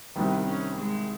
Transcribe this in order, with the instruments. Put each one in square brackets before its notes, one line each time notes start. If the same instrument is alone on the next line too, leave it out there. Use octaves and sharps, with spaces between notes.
[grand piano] C2 C3 D#3 G3 [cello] B3
[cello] C#4
G#3